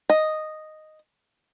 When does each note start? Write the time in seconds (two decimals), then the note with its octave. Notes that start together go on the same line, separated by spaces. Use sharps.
0.10 D#5